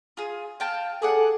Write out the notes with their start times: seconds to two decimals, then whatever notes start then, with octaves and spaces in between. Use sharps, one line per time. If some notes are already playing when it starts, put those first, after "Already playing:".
0.17 F4 G#4
0.60 F5 G5 A5
1.02 G#4 A4 D5 F#5